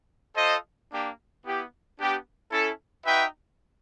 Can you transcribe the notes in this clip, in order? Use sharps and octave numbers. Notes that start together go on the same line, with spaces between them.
F4 A4 C5 D#5
A#3 D4 G4
B3 E4 G4
B3 D4 G4
C#4 E4 A4
D#4 F#4 B4 E5 G5